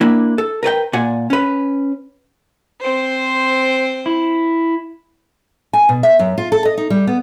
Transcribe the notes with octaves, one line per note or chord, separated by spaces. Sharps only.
A#3 D4 E4
A4
A#4 B4 D5 G5
A#2 D5 F#5 G#5
C#4 B4
C4 C5
E4
G#5
B2
E5
F#2
F4
A4
D#5
D#4
G3
B3